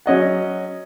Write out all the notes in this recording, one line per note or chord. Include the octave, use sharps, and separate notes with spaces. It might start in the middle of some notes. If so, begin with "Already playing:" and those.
F#3 C#4 D#5 F#5